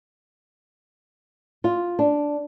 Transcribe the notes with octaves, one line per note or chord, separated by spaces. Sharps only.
F4
D4